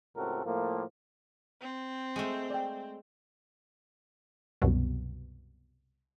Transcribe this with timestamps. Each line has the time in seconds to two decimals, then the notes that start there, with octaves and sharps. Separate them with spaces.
0.16 C#2 A2 C4 F#4 A4 A#4
0.45 A2 F3 A3 A#3
1.61 C4
2.16 G#3 A3
2.50 D5 G5
4.62 C2 F#2 B2